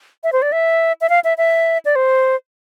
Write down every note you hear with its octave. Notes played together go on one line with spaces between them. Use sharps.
E5
C5
D5
E5
E5
F5
E5
E5
D5
C5